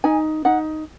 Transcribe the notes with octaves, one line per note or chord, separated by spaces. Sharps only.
D#4 G#5
D#4 F#5